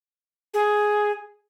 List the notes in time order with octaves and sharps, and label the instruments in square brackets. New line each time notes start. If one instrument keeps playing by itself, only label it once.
[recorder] G#4